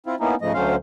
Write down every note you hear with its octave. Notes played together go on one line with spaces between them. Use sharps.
C4 E4 F4
A#3 B3 C#4 D#4 E4
G#2 C#3 F3 A3 D#5
D2 D3 F#3 C#4 C5 F5